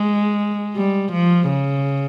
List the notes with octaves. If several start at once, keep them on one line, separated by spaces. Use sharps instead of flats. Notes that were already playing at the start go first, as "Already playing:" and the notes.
Already playing: G#3
G3
F3
C#3